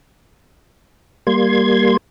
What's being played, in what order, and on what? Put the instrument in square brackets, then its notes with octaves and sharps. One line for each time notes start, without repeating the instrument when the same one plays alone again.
[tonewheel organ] G3 A#3 C6 G#6